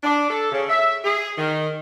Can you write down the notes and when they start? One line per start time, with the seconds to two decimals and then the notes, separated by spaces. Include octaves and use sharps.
0.03 D4
0.30 A4
0.51 C#3
0.69 E5
1.04 G#4
1.37 D#3